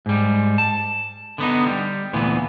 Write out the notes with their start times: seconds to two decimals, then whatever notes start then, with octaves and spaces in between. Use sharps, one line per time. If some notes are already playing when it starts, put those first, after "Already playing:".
0.06 G#2 G3
0.58 A5
1.38 D3 B3 D#4
1.67 G3
2.13 D2 A#2 E3 B3